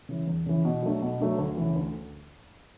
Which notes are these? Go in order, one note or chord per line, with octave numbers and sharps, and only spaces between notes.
C#3 E3
E2
C#3 E3
B2
F#3 A3 D4
B2
F#3 A3 D4
D2
C#3 E3
D2